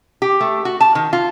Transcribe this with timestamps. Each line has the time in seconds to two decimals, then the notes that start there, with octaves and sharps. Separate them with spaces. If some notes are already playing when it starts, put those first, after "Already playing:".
0.22 G4
0.41 A3
0.65 F#4
0.81 A5
0.95 D#3
1.13 F4